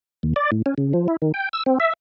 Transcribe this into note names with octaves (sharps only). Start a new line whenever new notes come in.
D#2
D5
A2
C#4
C#3
F3
E4
D#3
G5
E6
C4
E5